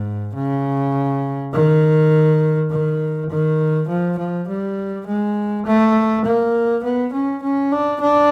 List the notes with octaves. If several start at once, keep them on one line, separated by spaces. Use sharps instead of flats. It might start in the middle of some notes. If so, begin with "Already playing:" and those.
Already playing: G#2
C#3
D#3
D#3
D#3
F3
F3
G3
G#3
A3
A#3
B3
C#4
C#4
D4
D4